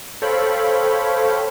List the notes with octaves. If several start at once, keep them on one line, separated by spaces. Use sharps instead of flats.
A4 C5 C#5 F5 G5 B5